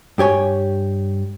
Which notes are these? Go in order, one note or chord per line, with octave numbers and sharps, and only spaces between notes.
G2 G4 C#5 G#5